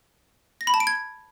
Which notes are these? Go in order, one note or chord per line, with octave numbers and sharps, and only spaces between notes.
A#6
B5
A5
D7
G#6